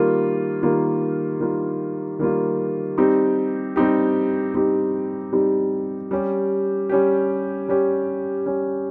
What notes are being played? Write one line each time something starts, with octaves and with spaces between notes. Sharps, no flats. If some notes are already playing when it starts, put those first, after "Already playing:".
Already playing: D#3 G3 A#3 F4
D#3 G3 A#3 F4
D#3 G3 A#3 F4
D#3 G3 A#3 F4
G3 C4 D#4 G4
G3 C4 D#4 G4
G3 C4 D#4 G4
G3 C4 D#4 G4
G3 C#4 G4
G3 C#4 G4
G3 C#4 G4
G3 C#4 G4